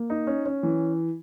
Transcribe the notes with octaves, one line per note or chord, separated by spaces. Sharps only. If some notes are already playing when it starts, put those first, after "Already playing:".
Already playing: A#3
D#4
C#4
C#4
E3